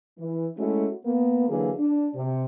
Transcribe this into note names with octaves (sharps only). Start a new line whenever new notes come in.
E3
G#3 A3 C#4 E4 F#4
A#3 B3
D3 E3 F#3 A#3 G#4
D4
C3